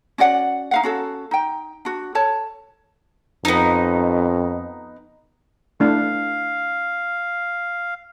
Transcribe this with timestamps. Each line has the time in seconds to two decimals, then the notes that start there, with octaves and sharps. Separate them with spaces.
0.18 C#4 F#4 D5 F#5
0.71 D#4 F5 F#5
0.83 C#4 F#4 A4
1.31 D#4 G5
1.85 D4 F#4
2.15 A4 C#5 A5
3.45 F2 B3 D#4
5.80 A3 D4 E4 F5